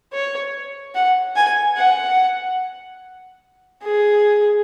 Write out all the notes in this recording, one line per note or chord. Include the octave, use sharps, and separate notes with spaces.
C#5
F#5
G#5
F#5
G#4